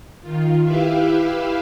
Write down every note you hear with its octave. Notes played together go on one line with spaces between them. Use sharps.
D#3 F4
E4 G4 B4 E5 F5